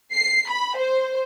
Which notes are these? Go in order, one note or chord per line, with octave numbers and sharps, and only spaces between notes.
C7
B5
C5